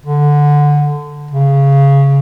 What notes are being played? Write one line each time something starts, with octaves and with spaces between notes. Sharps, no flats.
D3
C#3